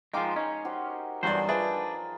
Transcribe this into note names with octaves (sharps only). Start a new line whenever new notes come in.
F3 G#3 D#4 G#4 A#4 F5 G5 D6
C#4 D#4 D#5
F#4 G4 C5
E2 G2 F#3 F#4 G#4 C5 D5
F3 D4 G#4 A#4 B4 E5